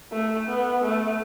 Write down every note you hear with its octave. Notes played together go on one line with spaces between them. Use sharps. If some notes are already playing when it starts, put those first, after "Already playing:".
A3
B3
A3